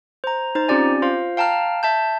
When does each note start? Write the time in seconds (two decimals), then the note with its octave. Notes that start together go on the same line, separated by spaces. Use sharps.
0.24 C5 A#5
0.55 D#4 C5 A#5
0.68 C4 C#4 F4 G4 D5 G#5
1.02 F4 C5 F5
1.37 F5 G5 A5 A#5 F6
1.83 E5 A5 G6